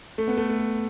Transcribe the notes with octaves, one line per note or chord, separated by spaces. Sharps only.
A3
B3
A3
A3